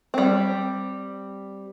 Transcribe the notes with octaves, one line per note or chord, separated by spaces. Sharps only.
G3 C4